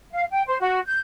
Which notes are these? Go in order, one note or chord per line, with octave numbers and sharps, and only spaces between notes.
F5
G5
C5
F#4
G6